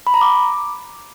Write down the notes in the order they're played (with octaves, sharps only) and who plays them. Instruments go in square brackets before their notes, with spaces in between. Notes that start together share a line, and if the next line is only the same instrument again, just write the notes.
[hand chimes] B5
A#5
D6